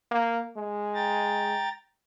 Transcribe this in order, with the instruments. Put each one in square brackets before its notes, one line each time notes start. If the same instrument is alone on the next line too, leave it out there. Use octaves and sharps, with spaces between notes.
[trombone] A#3
G#3
[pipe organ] G5 A#5 A6